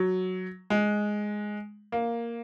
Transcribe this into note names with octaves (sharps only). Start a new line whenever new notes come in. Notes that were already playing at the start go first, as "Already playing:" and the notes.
Already playing: F#3
G#3
A#3